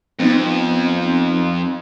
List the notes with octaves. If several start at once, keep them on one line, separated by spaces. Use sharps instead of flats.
F2 B3 C4 D#4